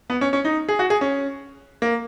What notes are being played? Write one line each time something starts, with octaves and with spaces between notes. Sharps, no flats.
B3
C#4
C#4
D#4
G#4
F#4
G#4
C#4
A#3